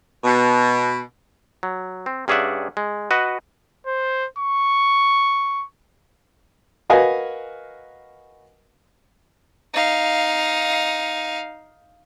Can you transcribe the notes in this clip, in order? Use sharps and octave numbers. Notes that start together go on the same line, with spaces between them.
B2
F#3
C4
G2 C#4 G#4 D5 E5 F#5
G#3
F#4 B4 D#5 F#5
C5
C#6
F#4 A#4 B4 D#5 F5 G#5
D#4 F5